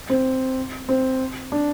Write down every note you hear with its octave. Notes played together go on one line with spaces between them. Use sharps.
C4
C4
D4